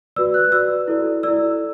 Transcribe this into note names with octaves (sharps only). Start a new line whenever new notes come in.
F#4 B4 D5 E6
F#6
F#4 B4 D5 E6
E4 A4 D5
E4 A4 D5 E6